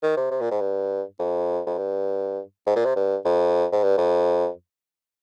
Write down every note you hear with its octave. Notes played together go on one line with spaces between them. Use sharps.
D#3
C3
C3
A#2
G#2
G2
F2
F2
G2
G#2
A#2
C3
G2
F2
G#2
G2
F2